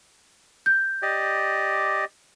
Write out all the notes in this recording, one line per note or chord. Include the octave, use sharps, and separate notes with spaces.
G6
G4 D5 D#5